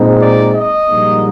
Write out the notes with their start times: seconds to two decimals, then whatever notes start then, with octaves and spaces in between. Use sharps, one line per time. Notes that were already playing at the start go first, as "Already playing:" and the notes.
Already playing: A#2 G#3 C4 D#4
0.21 D5
0.55 D#5
0.89 A#1 G#2 G3 A#3